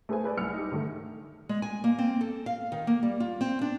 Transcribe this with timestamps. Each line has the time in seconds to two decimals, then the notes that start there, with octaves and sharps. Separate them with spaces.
0.09 A3 G#4 B4 C5 G#5
0.24 G#4 B4 D5
0.37 C2 F6 C#7
0.53 D#4 G4
0.72 D3 D#3 A3
1.49 G#3
1.62 G#5
1.84 A#3
1.99 C4
2.21 A4
2.46 F5
2.72 D#3
2.87 A#3
3.03 G3
3.20 F4
3.41 C4
3.61 D4